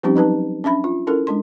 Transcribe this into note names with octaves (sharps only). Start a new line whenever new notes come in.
F3 G3 C4 C#4 D#4 G4
F#3 D#4 B4 A5
C#4 D4 E5 B5
F4
C#4 E4 A4 A#4
G#3 D4 C6